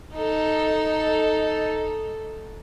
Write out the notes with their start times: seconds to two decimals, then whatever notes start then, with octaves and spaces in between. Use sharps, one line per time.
0.13 D#4 A4